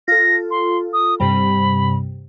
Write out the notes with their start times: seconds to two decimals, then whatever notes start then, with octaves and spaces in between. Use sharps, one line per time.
0.08 F4 A4 A#6
0.51 C6
0.93 D#6
1.20 G2 C3 G3 B5